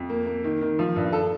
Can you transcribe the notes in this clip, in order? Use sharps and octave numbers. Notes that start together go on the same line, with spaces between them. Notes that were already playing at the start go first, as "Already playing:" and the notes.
Already playing: F2
A#3
A#3
D#3
D#3
F3
G2
A4